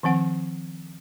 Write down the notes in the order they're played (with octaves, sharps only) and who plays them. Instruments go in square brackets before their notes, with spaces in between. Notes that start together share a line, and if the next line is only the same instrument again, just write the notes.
[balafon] D#3 F3 C4 F#5